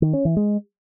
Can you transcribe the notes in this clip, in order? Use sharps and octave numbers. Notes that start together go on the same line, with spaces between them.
D#3
C#4
E3
G#3